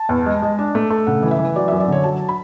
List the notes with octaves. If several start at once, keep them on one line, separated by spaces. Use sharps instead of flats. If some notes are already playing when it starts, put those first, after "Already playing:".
Already playing: A5
E2
G#3
G#3
D4
A3
A3
C#3 F#5
E3
E5
E3
F#3 D5
F#2 E5
D5
D3 C#5
F#3 A5
B5